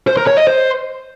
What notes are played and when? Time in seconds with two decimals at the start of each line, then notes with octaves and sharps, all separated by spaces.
0.07 C5
0.17 A#4
0.27 C#5
0.37 D#5
0.47 C5